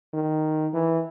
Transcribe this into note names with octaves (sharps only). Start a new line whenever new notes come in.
D#3
E3